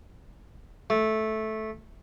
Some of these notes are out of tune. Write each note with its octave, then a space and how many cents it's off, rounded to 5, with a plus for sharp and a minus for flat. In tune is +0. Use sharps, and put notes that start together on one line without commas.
A3 -10